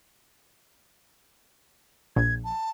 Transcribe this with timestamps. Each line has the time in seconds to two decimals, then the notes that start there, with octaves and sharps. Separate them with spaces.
2.16 A#1 G#6
2.44 A5